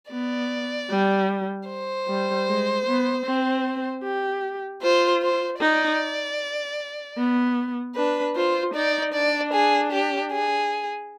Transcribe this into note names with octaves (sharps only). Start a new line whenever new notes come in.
B3 D5
G3
C5
G3
G#3
B3
C4
G4
F4 C5
C5
D#4 D5
B3
D4 B4
F4 C5
D#4 D5
D4 D5
G#4
G4
G#4